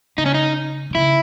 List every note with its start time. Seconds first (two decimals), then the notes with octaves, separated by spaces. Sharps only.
0.18 C#3 D#4
0.26 C#4
0.34 D#4
0.90 C3
0.95 C#3 E4